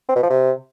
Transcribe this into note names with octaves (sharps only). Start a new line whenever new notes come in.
C4
B2
F3
C3